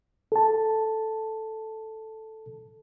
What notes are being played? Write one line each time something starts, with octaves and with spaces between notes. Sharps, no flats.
A4 A5